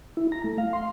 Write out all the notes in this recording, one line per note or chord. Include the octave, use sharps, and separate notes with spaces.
E4
A#5
A3
F5
C6